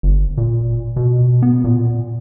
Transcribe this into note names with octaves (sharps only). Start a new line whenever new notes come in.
G1
A#2
B2
B3
A#2